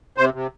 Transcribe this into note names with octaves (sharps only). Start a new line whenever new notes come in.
C3 C5
C3